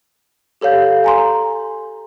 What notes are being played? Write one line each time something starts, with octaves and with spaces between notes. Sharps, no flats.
G4 A4 C#5 F5 G6
G#5 A#5 C6